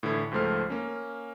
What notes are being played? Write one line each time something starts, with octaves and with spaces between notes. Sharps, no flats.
A2 D3 E3 E4
C#2 G#2 F3 A3 C5 F6
A#3 C#4